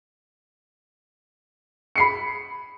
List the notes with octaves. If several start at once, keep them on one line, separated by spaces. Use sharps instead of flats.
B5 C7 C#7